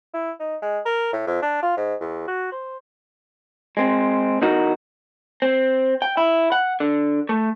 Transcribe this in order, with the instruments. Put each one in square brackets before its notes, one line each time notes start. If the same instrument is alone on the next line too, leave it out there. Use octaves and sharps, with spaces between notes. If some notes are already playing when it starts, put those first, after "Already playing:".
[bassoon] E4
D#4
G#3
A#4
A2
F2
D4
F4
G#2
E2
F#4
C5
[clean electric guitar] G#3 C4
E2 D#4 F#4 A#4
C4
G5
E4
F#5
D3
A3